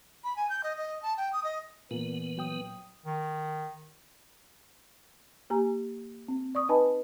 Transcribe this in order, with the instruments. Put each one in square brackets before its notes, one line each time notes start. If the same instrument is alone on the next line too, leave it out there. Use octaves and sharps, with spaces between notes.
[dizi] B5
G#5
G6
D#5
D#5
A5
G5
D#6
D#5
[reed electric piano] A#2 [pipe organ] E3 [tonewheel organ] B3
[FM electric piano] F#3 G5 D#6
[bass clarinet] D#3
[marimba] A#3 G4 G#5 A#5
C4
D5 C#6 D#6
D#4 B4 D#5 G#5 A5 B5